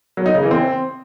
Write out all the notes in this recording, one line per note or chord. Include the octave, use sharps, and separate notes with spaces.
F#3
D#4
C#3
E3
C4